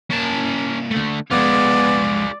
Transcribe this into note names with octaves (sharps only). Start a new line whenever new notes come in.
C2 A#3 C#4 A5
D3 A3
F2 G#3 B3 F4 G#4 D5